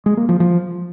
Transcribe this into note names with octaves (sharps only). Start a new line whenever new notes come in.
G#3
A#3
F3
F3